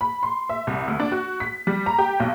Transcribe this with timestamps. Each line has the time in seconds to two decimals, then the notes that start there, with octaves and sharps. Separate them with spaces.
0.01 B5
0.23 C6
0.49 E5
0.67 C2
0.88 D2
1.00 D4
1.12 F#4
1.40 B6
1.67 G3
1.86 A#5
1.98 G4
2.20 B1